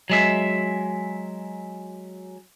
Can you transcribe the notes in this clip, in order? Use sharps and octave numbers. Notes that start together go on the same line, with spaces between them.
F#3 G#3 E5